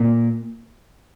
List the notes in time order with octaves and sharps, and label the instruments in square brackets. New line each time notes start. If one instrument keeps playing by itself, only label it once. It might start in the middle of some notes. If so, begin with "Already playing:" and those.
Already playing: [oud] A#2 A#3